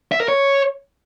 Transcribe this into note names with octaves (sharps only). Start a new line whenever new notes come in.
E5
A#4
C#5